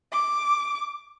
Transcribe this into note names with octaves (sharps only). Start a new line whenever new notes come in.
D6